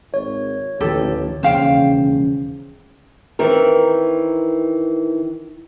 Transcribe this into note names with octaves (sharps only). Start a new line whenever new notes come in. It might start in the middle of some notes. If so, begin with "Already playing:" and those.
G#1 C#5
A1 D2 D#3 F3 G4 A4
E1 D#2 C#3 C#4 C5 F5 G5
D#3 E3 C4 A#4